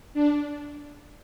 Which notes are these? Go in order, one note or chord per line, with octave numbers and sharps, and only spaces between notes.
D4